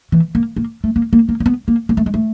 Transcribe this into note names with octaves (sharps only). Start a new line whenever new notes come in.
E3
A#3
A#3
A3
A#3
A#3
A#3
A#3
B3
A#3
A#3
A3
G#3
A3